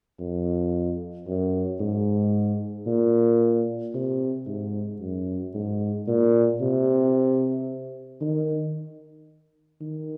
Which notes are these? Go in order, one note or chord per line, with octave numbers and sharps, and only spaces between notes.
F2
F#2
G#2
A#2
C3
G#2
F#2
G#2
A#2
C3
D#3
D#3